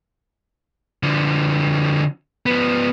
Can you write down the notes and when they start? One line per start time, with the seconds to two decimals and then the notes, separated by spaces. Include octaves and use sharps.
1.03 D3 F3
2.46 F3 B3